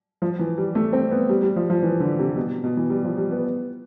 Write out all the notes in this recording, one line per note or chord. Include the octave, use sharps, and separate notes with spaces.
F3
E3
G3
A3
C4
B3
G3
G3
F3
F3
E3
D3
C3
B2
B2
E3
G3
F3
G3
B3